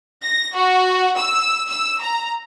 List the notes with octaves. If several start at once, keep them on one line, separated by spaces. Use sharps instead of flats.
A#6
F#4
E6
E6
A#5